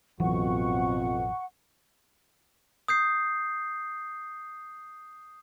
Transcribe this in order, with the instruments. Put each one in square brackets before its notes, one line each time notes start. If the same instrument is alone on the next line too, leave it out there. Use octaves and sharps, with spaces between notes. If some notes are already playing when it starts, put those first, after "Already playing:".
[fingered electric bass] A1 E3 F#3 [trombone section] F2 B2 [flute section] F#5 C#6
[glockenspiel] D#6 G6 C7